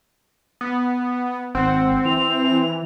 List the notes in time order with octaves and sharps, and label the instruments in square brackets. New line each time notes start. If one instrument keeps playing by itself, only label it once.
[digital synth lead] B3
[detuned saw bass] G#1 [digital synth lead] C4 [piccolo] F#5
[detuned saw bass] E3 [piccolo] F7